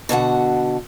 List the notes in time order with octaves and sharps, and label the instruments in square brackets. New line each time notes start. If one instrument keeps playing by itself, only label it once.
[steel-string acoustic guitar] B2 D3 F#4 F#5